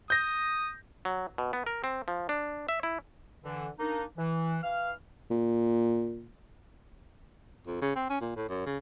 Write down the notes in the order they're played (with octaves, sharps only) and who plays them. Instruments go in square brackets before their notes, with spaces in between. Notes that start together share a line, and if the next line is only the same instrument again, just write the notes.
[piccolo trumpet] D#6 [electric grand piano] G6 A#6
[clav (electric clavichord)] F#3
B2
B3
A#4
C4
F3
D4
E5
E4
[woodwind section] D3 E3
A#3 D4 D#4
E3
E3 F5 F6
[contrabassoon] A#2
[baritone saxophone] F2
C#3
C4
C#4
A#2
A2
F#2
C#3